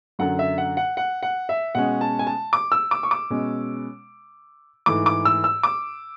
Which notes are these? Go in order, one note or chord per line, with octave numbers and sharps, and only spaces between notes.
F#2 D3 F#3 F#5
E5
F#5
F#5
F#5
F#5
E5
B2 G#3 C#4 F#5
A5
G#5
A5
D6
E6
D6
C#6
D6
B2 G#3 C#4
G#2 E3 A3 D6
D6
E6
E6
D6